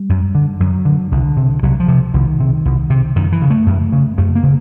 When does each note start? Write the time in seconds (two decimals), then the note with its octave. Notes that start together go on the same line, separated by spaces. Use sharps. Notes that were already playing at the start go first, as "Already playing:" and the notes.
Already playing: G3
0.09 F#2
0.35 D3
0.60 F#2 F#3
0.85 D3
1.12 C2 D3
1.37 C3
1.63 C2 F#3
1.80 F3
1.88 C3
2.14 C2 D#3
2.40 C3
2.65 C2
2.90 C3
3.16 F#2 D#3
3.32 E3
3.42 C#3
3.50 A3
3.66 F#2
3.92 C#3
4.18 F#2 A3
4.36 A#3
4.43 C#3